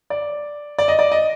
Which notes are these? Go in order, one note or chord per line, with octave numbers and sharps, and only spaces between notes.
D5
D5
D#5
D5
D#5